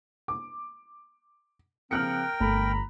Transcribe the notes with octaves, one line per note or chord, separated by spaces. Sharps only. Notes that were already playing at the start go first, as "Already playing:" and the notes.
D6
C#3 F3 C4 A#4 G5 F6 F#6 C#7
G1 A3 A#5 B5